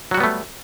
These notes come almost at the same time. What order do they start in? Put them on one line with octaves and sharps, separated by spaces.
F#3 F#4 G3 B3 A3